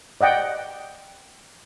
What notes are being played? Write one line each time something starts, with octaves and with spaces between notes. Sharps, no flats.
D5 D#5 F#5 G5